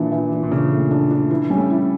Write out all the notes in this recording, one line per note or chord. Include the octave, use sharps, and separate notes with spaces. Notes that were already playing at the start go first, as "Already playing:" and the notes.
Already playing: A#2 E3 D4
E3
D4
A#2
C#3 D4
A3
D4
D4
E3 E4
G3 C#4
A3
E4